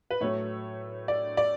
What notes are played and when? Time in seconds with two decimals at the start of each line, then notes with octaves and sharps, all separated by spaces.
0.11 B4
0.21 A2 F#3 A3 C#5
1.08 D5
1.37 D5